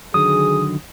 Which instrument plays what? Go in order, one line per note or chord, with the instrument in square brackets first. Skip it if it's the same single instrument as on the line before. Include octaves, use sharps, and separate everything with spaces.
[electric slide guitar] D3 D#3 F#3 [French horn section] G#4 [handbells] D#6